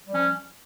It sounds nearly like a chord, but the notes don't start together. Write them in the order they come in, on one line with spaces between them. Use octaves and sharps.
G3 F3 C#4